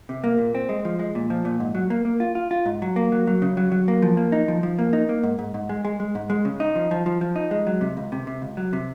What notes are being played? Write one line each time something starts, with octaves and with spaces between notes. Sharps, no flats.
C3
A#3
A#2
C4
G#3
F3
G#3
A#2
F3
A#2
G#2
F#3
A#3
A#3
F4
F4
F4
G#2
F#3
A#3
F#3
F#3
C#3
F#3
F#3
A#3
F3
A#3
D#4
F3
F3
A#3
D#4
A#3
G#2
G#2
G#2
G#3
G#3
G#3
G#2
G#3
C#3
D#4
F3
F3
F3
F3
D#4
G#3
F#3
C3
C#2
C3
C3
C#2
F#3
C3